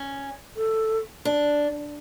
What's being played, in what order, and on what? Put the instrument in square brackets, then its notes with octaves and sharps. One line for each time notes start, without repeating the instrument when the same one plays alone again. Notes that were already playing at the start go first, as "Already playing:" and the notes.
Already playing: [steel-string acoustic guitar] C#4
[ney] A4
[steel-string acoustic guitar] D4